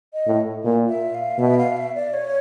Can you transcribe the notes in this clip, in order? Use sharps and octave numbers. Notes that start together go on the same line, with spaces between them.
D#5
A2
A#2
E5
F5
B2 E5
F5
E5
D5
C#5